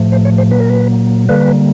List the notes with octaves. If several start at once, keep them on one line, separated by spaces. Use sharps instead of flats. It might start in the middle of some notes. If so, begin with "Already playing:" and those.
Already playing: A2 F3 A3
C5
C#5
C5
A#2 F#3 A#3 B4
A#4
B4
D3 G3 A#3 B4